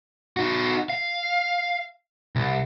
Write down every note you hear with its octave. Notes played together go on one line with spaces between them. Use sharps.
D#4 F#4
F5
C2